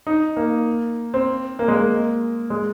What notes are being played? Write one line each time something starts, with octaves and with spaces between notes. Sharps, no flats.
D#4
A#3
C4
A#3
G#3
A#3
G#3